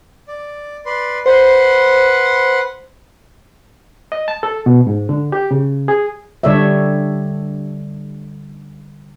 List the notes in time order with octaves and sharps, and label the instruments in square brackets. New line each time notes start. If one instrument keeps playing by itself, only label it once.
[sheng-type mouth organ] D5
B4 D5 C6
[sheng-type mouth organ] B4 F#5 C6 [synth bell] C5
[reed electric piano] D#5
A5
A4
B2
G#2
D3
G4
C#3
G#4
[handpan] D3 G3 A4 C#5 D5 E5